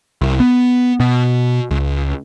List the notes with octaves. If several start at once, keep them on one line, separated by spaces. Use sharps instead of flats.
C2
B3
B2
C#2